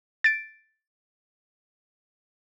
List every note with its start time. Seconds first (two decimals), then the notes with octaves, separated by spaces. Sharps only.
0.24 A6 D7